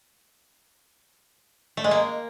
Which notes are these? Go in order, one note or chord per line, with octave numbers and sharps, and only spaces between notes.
A3
G#3
A#3